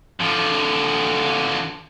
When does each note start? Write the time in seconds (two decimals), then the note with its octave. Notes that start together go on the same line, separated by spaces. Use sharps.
0.21 D3 F3